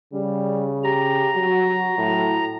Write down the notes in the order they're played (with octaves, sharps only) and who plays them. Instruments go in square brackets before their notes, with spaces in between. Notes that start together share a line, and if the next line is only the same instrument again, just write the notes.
[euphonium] C#3 [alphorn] G3
[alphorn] G4 [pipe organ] A#5
[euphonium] F#3 [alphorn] F#4
[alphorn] A2 [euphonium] F#3